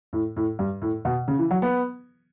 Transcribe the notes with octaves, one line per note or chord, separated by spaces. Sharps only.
A2
A2
G2
A2
B2
C#3
E3
F#3
B3